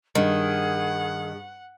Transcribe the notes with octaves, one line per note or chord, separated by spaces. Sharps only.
G2 D#3 G#4 F#5